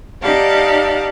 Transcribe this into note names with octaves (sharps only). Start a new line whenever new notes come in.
D#4 G4 D5 F5 F#5 A5